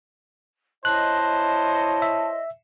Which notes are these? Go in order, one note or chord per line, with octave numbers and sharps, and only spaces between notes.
E4 C5 C#5 D#5 A5 F#6
E5